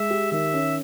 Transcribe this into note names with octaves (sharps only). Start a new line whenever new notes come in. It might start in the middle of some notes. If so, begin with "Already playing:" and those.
Already playing: G#3 E5
G4
D#3 E5
C#4